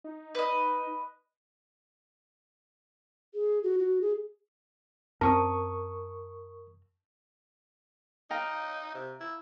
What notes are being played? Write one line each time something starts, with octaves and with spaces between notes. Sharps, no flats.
D#4
B4 D#5
G#4
F#4
F#4
G#4
F#2 C4 A#4 A5 C#6 D#6
D#4 F5 G5 A#5
C3
E4